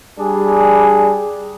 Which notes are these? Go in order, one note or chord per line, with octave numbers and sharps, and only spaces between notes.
G3 D4 G#4